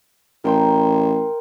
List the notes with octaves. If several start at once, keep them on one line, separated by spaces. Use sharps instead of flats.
A1 A#4 G5 C6